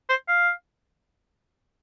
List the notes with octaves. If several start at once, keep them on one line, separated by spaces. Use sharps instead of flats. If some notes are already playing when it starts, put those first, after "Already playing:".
C5
F5